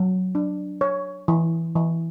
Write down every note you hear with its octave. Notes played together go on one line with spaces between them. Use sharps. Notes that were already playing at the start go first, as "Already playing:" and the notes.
Already playing: F#3
D4
C#5
E3
E3